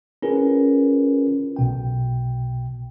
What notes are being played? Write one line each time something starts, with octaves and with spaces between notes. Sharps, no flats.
C#4 E4 F4 G#4 A#4 B4
B1 B2 G5